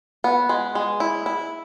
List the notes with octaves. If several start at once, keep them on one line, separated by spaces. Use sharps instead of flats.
B3
G#3
G#3
E4
E4